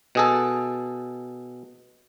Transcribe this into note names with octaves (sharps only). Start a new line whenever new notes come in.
B2 G#4 A4